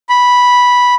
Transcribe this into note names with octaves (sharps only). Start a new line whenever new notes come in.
B5